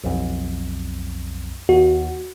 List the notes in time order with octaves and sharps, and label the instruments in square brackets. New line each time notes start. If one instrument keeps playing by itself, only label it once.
[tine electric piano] B1 F2
[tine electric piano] D#2 [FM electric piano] F#4